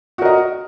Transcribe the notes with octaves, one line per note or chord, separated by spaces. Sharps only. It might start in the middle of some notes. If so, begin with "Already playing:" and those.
F#4 A#4 D#5